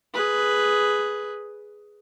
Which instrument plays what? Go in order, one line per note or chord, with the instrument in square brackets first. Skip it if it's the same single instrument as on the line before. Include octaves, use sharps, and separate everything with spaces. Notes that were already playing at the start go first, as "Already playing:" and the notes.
[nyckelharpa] G#4 B4